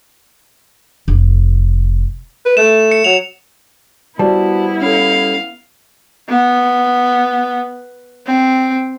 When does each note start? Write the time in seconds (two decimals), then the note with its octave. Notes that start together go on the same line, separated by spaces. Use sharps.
1.08 F1
2.46 B4
2.57 A3 E7
2.91 C#7
3.04 F#3 F7
4.19 G3 B3 E4 F#4 C5 A5
4.82 C#4 A4 F5
6.29 B3
8.27 C4